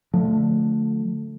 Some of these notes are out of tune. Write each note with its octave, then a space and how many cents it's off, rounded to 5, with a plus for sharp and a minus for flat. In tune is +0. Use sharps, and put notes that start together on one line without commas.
D3 +0 F3 +35 A3 +0